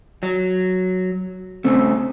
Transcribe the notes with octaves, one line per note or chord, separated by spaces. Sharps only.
F#3
C#3 A3 C4